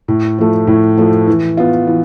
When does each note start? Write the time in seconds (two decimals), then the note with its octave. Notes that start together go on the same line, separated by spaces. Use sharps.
0.08 A2
0.38 F3 A3
0.67 A2
0.97 F3 A3
1.27 E3
1.57 B3 F4
1.87 E3